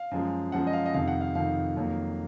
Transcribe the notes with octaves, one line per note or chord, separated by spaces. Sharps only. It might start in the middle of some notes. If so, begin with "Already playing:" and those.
Already playing: F5
F#2 F3 G#3
F#2 F3 G#3 F#5
D#5
F5
D#5
F2 C3 D#3 F5
F#5
F5
F2 C3 D#3 F5
F2 D#3 F#3 A#3